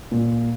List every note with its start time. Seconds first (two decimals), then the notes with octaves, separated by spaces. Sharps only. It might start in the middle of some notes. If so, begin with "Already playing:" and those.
0.12 A#2